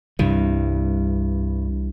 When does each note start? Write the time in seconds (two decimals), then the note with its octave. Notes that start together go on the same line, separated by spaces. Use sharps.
0.19 C2 G2 C3 E3